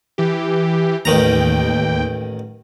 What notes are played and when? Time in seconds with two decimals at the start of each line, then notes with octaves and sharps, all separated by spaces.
0.18 E3 G4
1.05 A1 D#2 D#3 G5 A#5